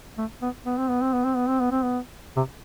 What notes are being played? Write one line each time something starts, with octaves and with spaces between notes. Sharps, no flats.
A3
B3
B3
C4
B3
C4
B3
C4
B3
C4
B3
C4
B3
C3